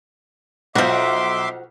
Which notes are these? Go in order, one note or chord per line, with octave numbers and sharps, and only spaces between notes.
B1 F3 F#4 E5 C6 D6